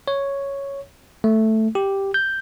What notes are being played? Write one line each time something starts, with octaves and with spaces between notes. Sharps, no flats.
C#5
A3
G4
G6